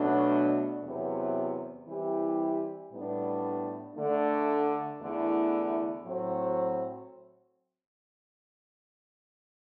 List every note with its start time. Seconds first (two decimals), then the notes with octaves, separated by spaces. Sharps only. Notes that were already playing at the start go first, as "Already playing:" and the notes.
Already playing: B2 F#3 A3 D4
0.83 E2 C3 F#3 B3
1.87 E3 G3 C4 E4 G4
2.91 A2 G3 B3 D4
3.95 D3 A3 D4
5.00 E2 D3 A3 E4
6.04 A2 F#3 C4 F#4